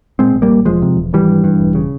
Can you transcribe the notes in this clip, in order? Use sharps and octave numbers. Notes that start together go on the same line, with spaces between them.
A#2 G#3 C4
A#1
G3 A#3
A#1
E1 F3 G#3
C3
E1
G#1 E3 G3
G2
G2
E1
C#3